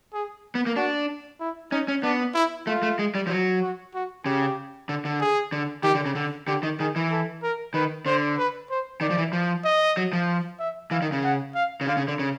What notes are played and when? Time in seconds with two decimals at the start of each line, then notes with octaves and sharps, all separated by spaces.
0.14 G#4
0.55 B3
0.66 A#3
0.76 D4 F#4
1.40 E4
1.72 C#4 D#4
1.88 C#4
2.03 B3 D4
2.35 E4
2.67 A3 F4
2.82 A3
2.99 G#3
3.15 G3
3.27 F3
3.30 F#3
3.62 F#4
3.94 F#4
4.25 C#3 G4
4.89 D3
5.05 D3
5.20 G#4
5.52 D3
5.84 D#3 G4
5.95 D3
6.06 C#3
6.15 D3
6.47 D3 G4
6.63 D#3
6.80 D#3 G#4
6.96 E3
7.11 A4
7.43 A#4
7.74 D#3 B4
8.06 D3 C5
8.38 B4
8.70 C5
9.01 D#3 D5
9.10 F3
9.18 E3
9.33 F3
9.64 D#5
9.97 F#3
10.13 F3
10.59 E5
10.91 E3 F5
11.02 D#3
11.12 C#3
11.24 F#5
11.55 F5
11.81 C#3
11.87 D3 F5
11.97 C#3
12.08 D3
12.19 C#3